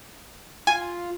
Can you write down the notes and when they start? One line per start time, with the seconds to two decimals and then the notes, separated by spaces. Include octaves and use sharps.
0.67 F4 G#5